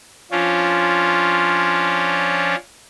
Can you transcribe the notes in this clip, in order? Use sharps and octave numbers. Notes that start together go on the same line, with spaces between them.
F3 C#4 D4 F4